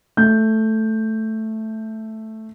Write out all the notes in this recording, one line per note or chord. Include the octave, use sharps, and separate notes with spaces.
A3 G6